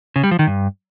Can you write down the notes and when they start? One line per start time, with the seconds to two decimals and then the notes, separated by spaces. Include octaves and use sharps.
0.16 C#3
0.24 G3
0.31 F3
0.39 D#3
0.47 G2